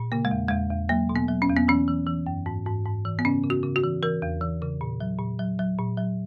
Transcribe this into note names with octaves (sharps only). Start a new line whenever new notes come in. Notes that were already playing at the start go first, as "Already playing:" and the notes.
Already playing: A#2
C#3 A#3
G#3
E2
E2 G#3
E2
F#3 A#3
B2
B3
F#3
C#4
E2
B3
E3 C#4
E3
E3
F#2
G#2
G#2
G#2
E3
B3
C#3 C#4
C#3
F#4
C#3
F#4
E3
E3 A#4
E2
E3
C#3
A#2
F#3
A#2
F#3
F#3
A#2
F#3